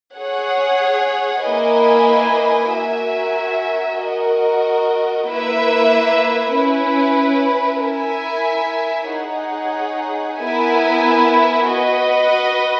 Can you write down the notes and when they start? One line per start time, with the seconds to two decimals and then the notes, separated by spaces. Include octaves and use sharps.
0.14 G#4 C#5 F#5
1.43 A#3 E4 B4 D#5 G#5
2.70 F#4 A#4 E5 G#5
3.99 F#4 A#4 D#5
5.26 A#3 E4 B4 E5
6.54 C#4 E4 B4
7.82 E4 A#4 E5 G#5
9.10 D#4 G#4 C#5 F#5
10.39 B3 E4 A#4 E5 G#5
11.67 F#4 B4 D#5